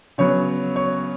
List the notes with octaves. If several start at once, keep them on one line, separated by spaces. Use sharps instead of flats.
C#3 F#3 B3 C#5
C#5